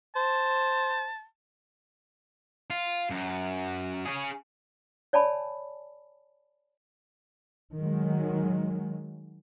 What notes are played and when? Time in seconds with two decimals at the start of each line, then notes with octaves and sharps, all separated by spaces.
0.16 C5 A5
2.70 F4
3.10 F#2
4.06 C#4 G#4
5.13 C#5 D5 G#5 A5 B5
7.77 D#3 F#3 G#3